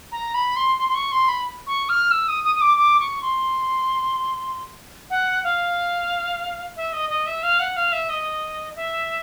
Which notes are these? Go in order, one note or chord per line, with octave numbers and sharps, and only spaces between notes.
A#5
B5
C6
C6
C6
C#6
C6
B5
C#6
F6
E6
D#6
D#6
D#6
D6
D6
C#6
C6
F#5
F5
E5
D#5
D#5
E5
F5
F#5
F5
E5
D#5
E5